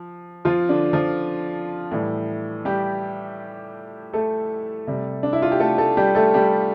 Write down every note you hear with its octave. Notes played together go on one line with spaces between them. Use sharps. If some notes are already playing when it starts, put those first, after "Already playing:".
Already playing: F3
F3 F4
D3 D4
F3 F4
A2 E3 G3
G3 G4
A3 A4
C3 G3
D4
E4
F4
G4
A3 A4
A3 A4
G3 G4
A3 A4
G3 G4